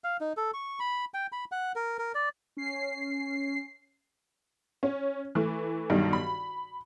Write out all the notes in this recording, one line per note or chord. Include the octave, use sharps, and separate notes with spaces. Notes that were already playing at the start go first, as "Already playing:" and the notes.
F5
D#4
A4
C#6
B5
G5
B5
F#5
A#4
A#4
D5
C#4 C7
C#4
E3 A3
B1 G2 D#3
B5